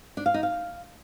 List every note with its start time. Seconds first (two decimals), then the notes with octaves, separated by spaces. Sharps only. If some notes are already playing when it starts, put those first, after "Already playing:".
0.17 D4
0.26 F5
0.34 D#4
0.43 F5